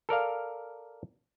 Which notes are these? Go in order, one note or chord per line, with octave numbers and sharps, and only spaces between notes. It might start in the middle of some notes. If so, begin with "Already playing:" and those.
A4 A#4 D5 F5